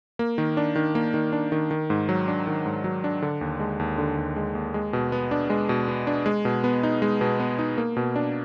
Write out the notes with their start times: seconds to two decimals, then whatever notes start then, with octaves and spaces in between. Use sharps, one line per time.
0.19 A#3
0.38 D#3
0.57 D4
0.76 D#3
0.95 A#3
1.14 D#3
1.33 D4
1.52 D#3
1.71 D#3
1.90 G#2
2.09 F#3
2.28 D4
2.47 D#3
2.66 G#2
2.84 F#3
3.04 D4
3.22 D3
3.41 D#2
3.60 G#3
3.79 D#2
3.98 D3
4.17 D#2
4.36 G#3
4.55 D#2
4.74 G#3
4.93 B2
5.12 B3
5.31 D4
5.50 G#3
5.69 B2
5.88 B3
6.07 D4
6.26 G#3
6.45 B2
6.64 B3
6.83 D#4
7.02 G#3
7.21 B2
7.40 B3
7.59 D#4
7.78 A#3
7.97 B2
8.16 D4